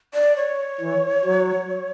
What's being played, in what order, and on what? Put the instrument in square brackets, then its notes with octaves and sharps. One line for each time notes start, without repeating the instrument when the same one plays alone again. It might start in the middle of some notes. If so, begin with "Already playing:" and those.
[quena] D5
C#5
[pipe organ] E3
F#3